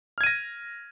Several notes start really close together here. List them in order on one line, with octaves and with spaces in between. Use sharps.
F6 G#6 D#7 A#6